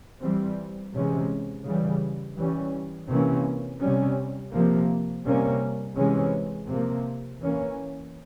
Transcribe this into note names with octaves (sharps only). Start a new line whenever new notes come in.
E3 G3 C4
C3 E3 G#3 C#4
C#3 E3 G3
E3 G3 C#4
C3 E3 A#3 C#4
C3 G3 C#4
C3 F3 A#3
C3 G3 A#3 C#4
C3 E3 G#3 C#4
C3 F3 A#3
E3 A#3 C#4